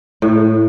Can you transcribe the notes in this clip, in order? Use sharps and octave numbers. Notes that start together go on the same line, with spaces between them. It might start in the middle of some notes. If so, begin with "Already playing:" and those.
A2